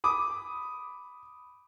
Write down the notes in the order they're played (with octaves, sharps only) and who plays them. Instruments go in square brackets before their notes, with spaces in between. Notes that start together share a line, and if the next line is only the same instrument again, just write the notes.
[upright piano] B5 D6 D#6